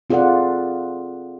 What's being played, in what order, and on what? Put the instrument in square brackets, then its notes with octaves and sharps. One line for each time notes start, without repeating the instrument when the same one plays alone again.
[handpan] C4 F4 G#4 A4 D5 F#5